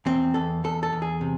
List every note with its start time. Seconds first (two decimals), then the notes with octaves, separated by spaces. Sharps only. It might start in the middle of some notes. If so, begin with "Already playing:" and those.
0.06 E2 C4
0.34 E2 A4
0.64 E2 A4
0.83 A4
0.93 E2
1.02 G#4
1.21 C3